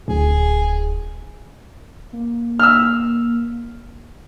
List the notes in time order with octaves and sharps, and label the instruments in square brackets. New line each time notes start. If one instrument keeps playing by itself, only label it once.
[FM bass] D1 [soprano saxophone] G#4
[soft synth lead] A#3
[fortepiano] E6 F6